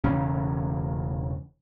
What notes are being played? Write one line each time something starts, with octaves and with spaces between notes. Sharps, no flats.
E1 C#3 E3 C#4